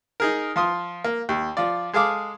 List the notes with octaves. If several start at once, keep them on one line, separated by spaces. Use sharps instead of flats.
D#4 G#4 A#4
F3 F4 C6 D#6
A#3
D#2
F3 F4 D5
G#3 G#4 A4 F5 D6